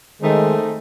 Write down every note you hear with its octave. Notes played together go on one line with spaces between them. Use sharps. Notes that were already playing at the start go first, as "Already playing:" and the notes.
D#3 G#3 A3 C4 D#4